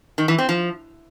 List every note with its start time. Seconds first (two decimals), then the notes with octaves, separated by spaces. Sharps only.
0.18 D#3
0.28 E3
0.38 C4
0.49 F3